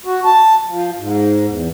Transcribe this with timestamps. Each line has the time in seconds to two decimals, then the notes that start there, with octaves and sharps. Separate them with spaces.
0.05 F#4
0.25 A5
0.67 F3
0.98 G#2
1.47 E2